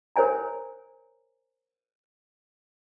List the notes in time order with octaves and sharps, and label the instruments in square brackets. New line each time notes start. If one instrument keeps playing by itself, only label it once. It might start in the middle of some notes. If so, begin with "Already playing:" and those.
[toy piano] A#4 C5 C#5 G#5 A#5